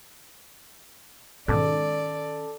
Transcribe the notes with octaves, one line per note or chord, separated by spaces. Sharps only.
G#2 B2 D#3 C#4 A4 D5 A5 D6